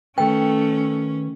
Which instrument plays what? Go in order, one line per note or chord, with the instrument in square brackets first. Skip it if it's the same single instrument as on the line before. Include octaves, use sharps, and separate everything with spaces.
[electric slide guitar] D#3 B4 [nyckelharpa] A3 [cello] C#4 [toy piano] G5